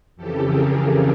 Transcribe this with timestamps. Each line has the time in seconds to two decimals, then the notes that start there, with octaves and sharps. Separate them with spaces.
0.16 F2 C#3 E3 G4 A4
0.45 G#4 A#4